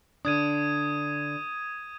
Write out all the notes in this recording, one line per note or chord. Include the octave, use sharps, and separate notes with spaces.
D3 D4 D#6 G#6 D#7